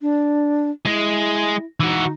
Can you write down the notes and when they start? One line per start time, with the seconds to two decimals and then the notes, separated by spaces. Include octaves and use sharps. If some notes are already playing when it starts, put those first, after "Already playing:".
0.01 D4
0.86 G#3 E4 G#4
1.80 E3 D#4 F#4